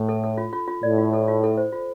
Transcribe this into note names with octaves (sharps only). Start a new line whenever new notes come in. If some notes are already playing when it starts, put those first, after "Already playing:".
Already playing: A2
A4
A4
F4
F4
F4
A2 D5
F4
A4
F4
A4
C5
F4